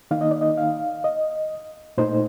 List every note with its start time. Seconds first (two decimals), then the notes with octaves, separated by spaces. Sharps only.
0.11 D#3 A#3 D#4 F5
0.21 D#5
0.31 D5
0.41 D#5
0.57 F5
1.04 D#5
1.98 A#2 A3 D#4 C5